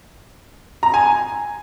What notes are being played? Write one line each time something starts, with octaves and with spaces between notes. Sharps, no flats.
A#5
G#5